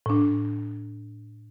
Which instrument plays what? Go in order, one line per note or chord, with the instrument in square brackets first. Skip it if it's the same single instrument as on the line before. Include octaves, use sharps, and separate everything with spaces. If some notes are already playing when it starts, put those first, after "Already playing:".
[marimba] A2 D4